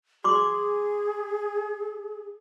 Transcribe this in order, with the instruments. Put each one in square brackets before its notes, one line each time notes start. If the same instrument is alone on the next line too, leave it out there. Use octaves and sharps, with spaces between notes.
[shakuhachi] G#4 [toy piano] C6 D6